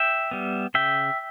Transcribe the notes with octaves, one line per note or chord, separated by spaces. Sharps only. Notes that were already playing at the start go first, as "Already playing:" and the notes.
Already playing: E5 G5
G3 B3
C#3 E5 G5